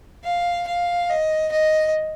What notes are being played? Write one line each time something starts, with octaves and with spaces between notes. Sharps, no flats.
F5
F5
D#5
D#5